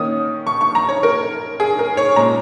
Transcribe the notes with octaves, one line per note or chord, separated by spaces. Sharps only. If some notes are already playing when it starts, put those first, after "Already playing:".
Already playing: D#3 A#3 C#4 D#6
C#6
C#6
A#5
C#5
A#4
G#4
A#4
C#5
A#2 G#3 C#4 A#5